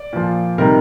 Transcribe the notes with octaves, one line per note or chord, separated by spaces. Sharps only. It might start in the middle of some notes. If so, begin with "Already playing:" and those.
Already playing: D5
A#2 F3
C3 D#3 G3 A#4